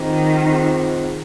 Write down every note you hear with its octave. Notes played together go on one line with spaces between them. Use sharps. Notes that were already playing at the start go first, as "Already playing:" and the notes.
Already playing: D#3 C4 F4 G#4 C5 D#5
C4 F4 G#4 C5 D#5